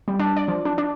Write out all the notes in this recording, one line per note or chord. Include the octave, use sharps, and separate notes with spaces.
G3
D4
D5
F3
D4
D4